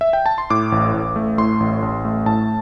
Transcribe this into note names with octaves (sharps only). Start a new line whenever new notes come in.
E5
G5
A5
C6
A2 D6
A1
A1
A3
A2 C6
A1
A1
A3
A2 A5